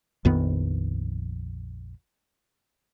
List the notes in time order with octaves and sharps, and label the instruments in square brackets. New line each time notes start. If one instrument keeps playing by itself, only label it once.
[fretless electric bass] A#1 F2 D#3 B3